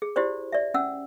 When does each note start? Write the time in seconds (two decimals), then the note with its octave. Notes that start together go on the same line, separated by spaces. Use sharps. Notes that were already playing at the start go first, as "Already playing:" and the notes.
0.02 G#4
0.16 E4 F#4 G4 C5 D5
0.52 D5 E5
0.74 C#4 F#5 E6